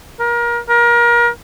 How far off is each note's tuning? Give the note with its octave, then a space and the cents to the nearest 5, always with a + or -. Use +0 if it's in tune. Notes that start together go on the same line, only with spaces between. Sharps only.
A#4 +30
A#4 +30